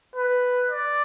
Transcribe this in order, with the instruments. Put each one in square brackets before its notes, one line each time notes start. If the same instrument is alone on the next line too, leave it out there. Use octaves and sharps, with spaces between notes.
[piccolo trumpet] B4
D5